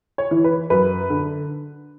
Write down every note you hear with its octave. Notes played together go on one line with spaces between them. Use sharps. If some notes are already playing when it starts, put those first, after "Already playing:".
C#5
E3
B4
F#2 B4
D3